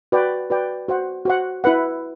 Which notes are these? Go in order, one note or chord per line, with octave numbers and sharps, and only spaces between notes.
F#4 B4 D5 G5
F#4 B4 D5 G5
F#4 C5 F#5
F#4 C5 F#5
E4 B4 F#5